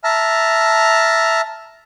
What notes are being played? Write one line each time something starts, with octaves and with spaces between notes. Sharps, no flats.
E5 A5 A#5 F6